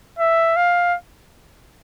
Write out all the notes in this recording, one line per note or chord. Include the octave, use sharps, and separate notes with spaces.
E5
F5